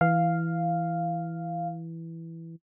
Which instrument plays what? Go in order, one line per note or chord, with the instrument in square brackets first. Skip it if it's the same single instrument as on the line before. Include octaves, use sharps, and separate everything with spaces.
[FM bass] E3 [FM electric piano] F5